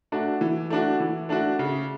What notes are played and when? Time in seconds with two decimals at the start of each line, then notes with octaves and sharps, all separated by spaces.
0.12 A3 D4 F#4
0.41 E3
0.70 A3 D4 F#4
1.00 E3
1.29 A3 D4 F#4
1.59 C#3